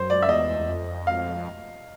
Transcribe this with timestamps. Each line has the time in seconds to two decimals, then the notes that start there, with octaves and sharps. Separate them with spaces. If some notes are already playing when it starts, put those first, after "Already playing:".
Already playing: F#2 C5
0.10 D5
0.22 E5
0.29 E2 D#5
0.59 E2
0.68 F2
1.07 F5